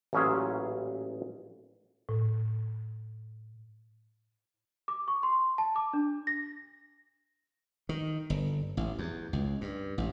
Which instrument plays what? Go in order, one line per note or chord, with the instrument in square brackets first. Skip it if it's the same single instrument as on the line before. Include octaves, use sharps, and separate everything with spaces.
[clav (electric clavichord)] A1 A#2 F#3 C#4 E4 G#4
[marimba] A2
[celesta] D6
C#6
C6
A5
D6
D4
A#6
[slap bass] D#3
G1
A1
E2
C#2
G2
A1